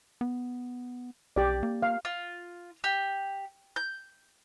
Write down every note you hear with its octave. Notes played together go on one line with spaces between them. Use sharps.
B3
B1 G4 D5
A#3
F5
F4
G4
G6